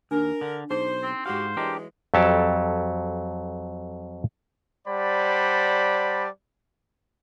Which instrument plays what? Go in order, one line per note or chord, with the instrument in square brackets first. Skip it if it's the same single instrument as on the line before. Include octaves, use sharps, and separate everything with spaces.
[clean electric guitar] D#2 [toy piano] D4 [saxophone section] A#4
[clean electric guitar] D3
[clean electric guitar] B1 [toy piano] D#4 G#4 [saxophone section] C5
[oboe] C4
[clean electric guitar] G#2 F5 [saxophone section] F#4 G4 [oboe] C5 [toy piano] F#5
[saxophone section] E3 F#3 G#3 [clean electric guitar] D4 G4 A#4
[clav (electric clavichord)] F2 F#3 G4 A4 A5
[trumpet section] G3 C5 D5 F#5 A5 B5